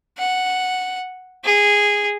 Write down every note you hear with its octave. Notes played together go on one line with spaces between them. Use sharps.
F#5
G#4